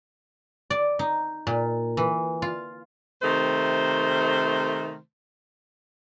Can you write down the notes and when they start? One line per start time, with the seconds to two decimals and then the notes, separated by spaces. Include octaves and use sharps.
0.70 D5
0.99 D#4
1.47 A#2
1.97 E3
2.42 F4
3.22 C3 D#3 A3 C5